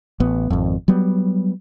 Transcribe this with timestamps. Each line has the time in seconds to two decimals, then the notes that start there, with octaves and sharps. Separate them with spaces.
0.20 A1 B3
0.50 G#1 F2
0.88 F#3 G3 B3